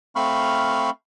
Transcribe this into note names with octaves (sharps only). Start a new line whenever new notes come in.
A3 C4 F5 B5 C#6 F6